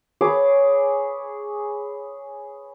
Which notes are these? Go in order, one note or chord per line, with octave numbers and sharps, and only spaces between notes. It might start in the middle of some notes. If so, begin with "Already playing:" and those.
G#4 B4 C#5 D6